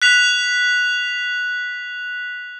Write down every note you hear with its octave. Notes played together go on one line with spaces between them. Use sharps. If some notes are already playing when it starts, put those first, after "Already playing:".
F#6 B6 F7